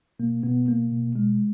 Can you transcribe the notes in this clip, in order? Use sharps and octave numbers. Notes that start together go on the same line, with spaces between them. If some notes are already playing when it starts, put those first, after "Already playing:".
B2 A#3
B2 B3
B2 A#3
B2
B2 G#3